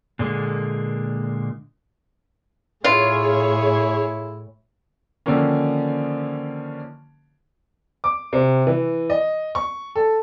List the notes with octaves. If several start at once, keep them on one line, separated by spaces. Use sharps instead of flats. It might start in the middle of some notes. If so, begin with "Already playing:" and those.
A#2 D3 G#3 A#3
A2 E4 F4 G#4 C#5
D3 D#3 F3 A#3 C#4
D6
C3
E3
D#5
C#6
A4